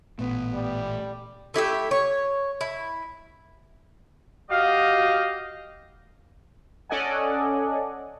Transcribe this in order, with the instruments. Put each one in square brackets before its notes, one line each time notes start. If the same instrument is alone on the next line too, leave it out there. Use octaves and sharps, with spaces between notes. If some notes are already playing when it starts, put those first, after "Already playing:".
[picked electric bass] A1 A3 [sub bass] A#2 [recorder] B3
[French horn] G3
[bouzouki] A3 E4 G4 E5
C#5
E4
[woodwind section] F#4 G4 D#5 F5
[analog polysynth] C#4 A4 D5 D#5 F#5 G#5